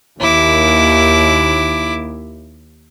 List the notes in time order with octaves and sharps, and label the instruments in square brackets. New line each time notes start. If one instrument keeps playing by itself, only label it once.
[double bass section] D#2 [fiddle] E4 D6